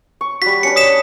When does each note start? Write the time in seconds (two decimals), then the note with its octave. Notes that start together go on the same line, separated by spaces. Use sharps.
0.21 C#6
0.42 G3 F#4 B6
0.63 C#4 D4 B4 B6 C#7
0.76 D#6 B6 E7